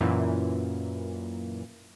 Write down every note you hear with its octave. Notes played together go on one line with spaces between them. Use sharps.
F#2 A#2 E3